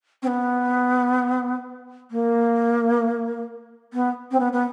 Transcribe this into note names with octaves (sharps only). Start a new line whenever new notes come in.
C4
B3
A#3
B3
C4
B3
B3